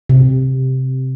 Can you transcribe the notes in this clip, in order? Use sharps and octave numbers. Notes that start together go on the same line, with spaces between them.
C3